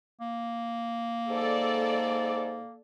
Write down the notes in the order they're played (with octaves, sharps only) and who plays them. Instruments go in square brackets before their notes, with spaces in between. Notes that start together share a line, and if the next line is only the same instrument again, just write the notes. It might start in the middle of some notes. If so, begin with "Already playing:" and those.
[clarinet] A#3
[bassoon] G#2 [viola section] A4 D5